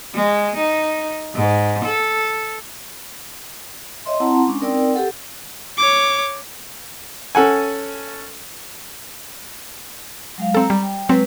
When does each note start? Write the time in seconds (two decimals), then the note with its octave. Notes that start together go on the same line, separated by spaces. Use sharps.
0.15 G#3
0.57 D#4
1.35 G#2
1.85 A4
4.06 C#5 D#5 E5 C6
4.20 C4 E4 F#5 A5 A#5 C6
4.47 G#3 C#4 D4
4.60 C4 D#4 A#4 D5 G5 E6
4.94 G4 A4 F#5
5.78 C#5 D6
7.35 C#4 A4 F#5 G#5
10.38 F#3 G#3 F5
10.55 C4 A4 A#5
10.70 G3
10.83 G5
11.09 F#3 G#3 C4 B4